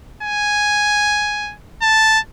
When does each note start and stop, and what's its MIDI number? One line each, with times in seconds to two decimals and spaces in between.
0.23 1.55 80
1.82 2.19 81